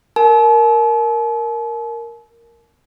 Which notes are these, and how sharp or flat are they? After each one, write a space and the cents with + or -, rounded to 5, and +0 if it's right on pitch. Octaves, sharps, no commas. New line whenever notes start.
A#4 +0 A5 -45